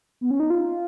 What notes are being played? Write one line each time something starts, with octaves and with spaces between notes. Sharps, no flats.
B3
C#4
D#4
F4